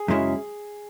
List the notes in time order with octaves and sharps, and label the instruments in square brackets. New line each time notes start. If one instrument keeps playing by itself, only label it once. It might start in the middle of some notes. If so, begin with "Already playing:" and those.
Already playing: [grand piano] G#4
[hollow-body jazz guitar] F#2 C#3 G#3 C#4 E4